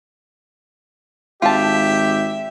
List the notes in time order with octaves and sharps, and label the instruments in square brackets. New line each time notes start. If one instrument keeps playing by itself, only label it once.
[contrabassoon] G#1 [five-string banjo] F4 A5 [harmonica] G4 E5